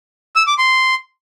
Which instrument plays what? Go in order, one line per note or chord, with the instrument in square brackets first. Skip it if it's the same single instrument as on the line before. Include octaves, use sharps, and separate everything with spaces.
[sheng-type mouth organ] E6
D6
C6